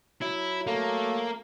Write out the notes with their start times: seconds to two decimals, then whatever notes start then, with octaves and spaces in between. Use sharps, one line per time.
0.22 F#3 E4
0.67 A3 A#3